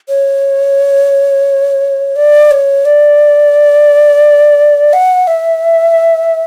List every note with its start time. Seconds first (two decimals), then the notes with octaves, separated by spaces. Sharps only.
0.09 C#5
2.16 D5
2.51 C#5
2.85 D5
4.93 F#5
5.27 E5